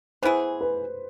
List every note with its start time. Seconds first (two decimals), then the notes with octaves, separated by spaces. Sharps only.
0.22 E3 B3 E4 G#4 C5
0.61 B4